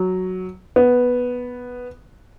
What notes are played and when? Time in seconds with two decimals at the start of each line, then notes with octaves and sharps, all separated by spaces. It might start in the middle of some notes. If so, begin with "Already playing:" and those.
Already playing: F#3
0.76 B3